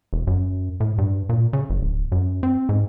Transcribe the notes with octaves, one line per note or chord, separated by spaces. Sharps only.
E1
F#2
A2
G2
A#2
C#3
F#1
D1
F#2
C4
G#2